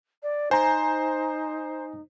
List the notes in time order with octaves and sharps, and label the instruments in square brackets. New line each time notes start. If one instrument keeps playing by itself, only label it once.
[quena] D5
[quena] D#4 [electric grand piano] C5 [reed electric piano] G#5 A#5